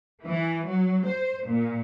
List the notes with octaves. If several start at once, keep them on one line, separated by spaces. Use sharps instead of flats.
E3
F#3
C5
A#2